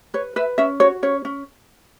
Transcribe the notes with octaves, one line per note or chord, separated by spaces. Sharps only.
B4 C#5
B4 E5
C#4 E5
F#4 C#5
C#4 C#5
C#4